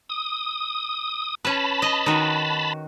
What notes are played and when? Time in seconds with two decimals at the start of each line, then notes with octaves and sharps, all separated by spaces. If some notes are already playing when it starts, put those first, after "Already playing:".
0.09 D#6
1.45 C#4 B4 A5 B5
1.82 D#5
2.06 D#3 F#4